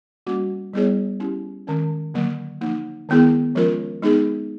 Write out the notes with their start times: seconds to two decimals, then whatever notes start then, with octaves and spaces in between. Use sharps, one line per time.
0.27 G3 A#3 C#4 F#4
0.74 G3 B3 E4 G#4 C#5
1.20 C#4 E4 G4
1.67 D#3 G#3 C#4
2.14 D3 F#3 A#3
2.61 F3 A#3 D#4
3.09 D#3 G#3 B3 E4 G#4
3.55 F3 G#3 C#4 F4 A#4
4.02 G#3 B3 D#4 G#4